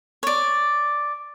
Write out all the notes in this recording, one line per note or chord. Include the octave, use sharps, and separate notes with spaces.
C#5 D5